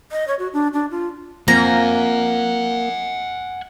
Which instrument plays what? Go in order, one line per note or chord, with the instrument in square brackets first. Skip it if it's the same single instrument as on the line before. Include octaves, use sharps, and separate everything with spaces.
[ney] D#5
C#5
F#4
D4
D4
F4
[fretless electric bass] F3 C4 [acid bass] A#3 [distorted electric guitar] F#5 G#5 [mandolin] A#5